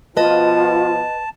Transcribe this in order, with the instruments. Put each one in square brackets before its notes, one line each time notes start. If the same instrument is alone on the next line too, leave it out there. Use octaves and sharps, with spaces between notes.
[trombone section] B2 F3 [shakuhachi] F4 [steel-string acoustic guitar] B4 D#5 [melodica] A5